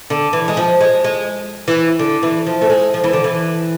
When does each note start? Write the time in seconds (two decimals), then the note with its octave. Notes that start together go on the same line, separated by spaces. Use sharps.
0.10 D3
0.33 E3
0.48 G#3
0.57 F3
0.81 G#3
1.04 G#3
1.68 E3
1.99 D3
2.23 E3
2.46 F3
2.61 A3
2.70 G#3
2.94 F3
3.04 E3
3.13 D3
3.24 E3